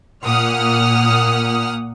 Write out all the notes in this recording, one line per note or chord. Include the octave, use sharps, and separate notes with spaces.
A#2 A#3 F#5 D#6 F6